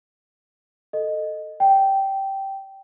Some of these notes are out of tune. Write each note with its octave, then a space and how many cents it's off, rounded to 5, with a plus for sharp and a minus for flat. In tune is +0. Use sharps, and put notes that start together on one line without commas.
A4 +5 D#5 -10
D5 +0 G5 -10